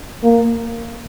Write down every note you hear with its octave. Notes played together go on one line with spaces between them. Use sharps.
A#3